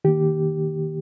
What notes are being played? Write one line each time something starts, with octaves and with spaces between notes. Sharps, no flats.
D#3 A#3 G4